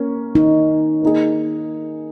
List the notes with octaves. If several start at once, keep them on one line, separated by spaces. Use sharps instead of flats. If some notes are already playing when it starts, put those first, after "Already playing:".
Already playing: A#3 C#4
D#4
A#3 D#4 G#4